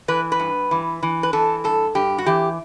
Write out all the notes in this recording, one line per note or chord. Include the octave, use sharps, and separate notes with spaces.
E3 B4
B4
G2
E3
E3
B4
E3 A4
G2 A4
G2 G4
F#4
E3 G4